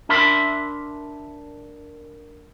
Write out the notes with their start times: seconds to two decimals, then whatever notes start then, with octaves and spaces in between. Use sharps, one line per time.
0.09 D4 A#4 E5 B5 C6